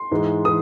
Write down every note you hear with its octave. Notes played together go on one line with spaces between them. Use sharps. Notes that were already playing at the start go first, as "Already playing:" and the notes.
Already playing: C6
G#2 E3 G#3
E3 D#6